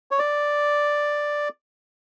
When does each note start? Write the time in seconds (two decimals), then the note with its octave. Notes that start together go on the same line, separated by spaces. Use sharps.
0.11 C#5
0.19 D5